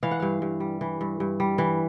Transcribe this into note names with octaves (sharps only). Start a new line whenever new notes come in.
E3 F5
F#5
G2 F5
G2
G3
E3
G2
G2
G3
E3